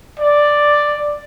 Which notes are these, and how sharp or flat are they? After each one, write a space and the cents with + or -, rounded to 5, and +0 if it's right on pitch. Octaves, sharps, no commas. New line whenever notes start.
D5 +5